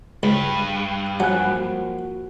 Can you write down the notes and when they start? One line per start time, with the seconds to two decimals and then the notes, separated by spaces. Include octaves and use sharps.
0.23 C#2 G2
1.20 F3 F#3 A#3 F#4 F#5 G#5 F#6